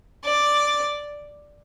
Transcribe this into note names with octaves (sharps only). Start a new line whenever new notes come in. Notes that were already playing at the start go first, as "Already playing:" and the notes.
D5